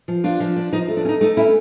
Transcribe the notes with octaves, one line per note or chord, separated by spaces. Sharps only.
F3
D4 F4
F3
D4
F3 D#4
A3
D4
C#4
D#4
A3 D#4
C#4 E4